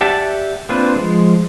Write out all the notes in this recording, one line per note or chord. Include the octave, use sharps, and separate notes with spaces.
G4 D5 E5 F#5 A5
A#3 C4 D4 F4 B4
F3 G#3